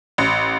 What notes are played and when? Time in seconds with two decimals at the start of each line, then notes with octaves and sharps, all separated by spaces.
0.18 A1